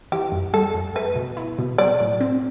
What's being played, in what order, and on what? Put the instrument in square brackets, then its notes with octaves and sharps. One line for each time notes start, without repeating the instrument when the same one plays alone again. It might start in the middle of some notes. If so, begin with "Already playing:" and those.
[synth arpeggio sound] E3 [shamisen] G4
[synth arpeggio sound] F#2
[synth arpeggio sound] G3 [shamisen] A4
[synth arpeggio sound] F#2
[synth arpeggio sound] A3 [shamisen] B4
[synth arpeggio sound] B2
E4
B2
[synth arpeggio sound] F#3 [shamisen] D5
[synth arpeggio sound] A2
C4